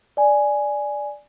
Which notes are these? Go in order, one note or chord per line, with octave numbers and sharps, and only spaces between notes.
D5 G#5